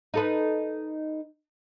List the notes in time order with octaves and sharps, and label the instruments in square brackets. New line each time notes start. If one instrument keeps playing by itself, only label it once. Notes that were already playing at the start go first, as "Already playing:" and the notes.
[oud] D#4 A4 B4